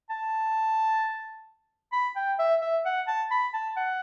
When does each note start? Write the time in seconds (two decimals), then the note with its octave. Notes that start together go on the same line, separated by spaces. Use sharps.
0.10 A5
1.93 B5
2.16 G5
2.39 E5
2.62 E5
2.86 F#5
3.08 A5
3.31 B5
3.54 A5
3.77 F#5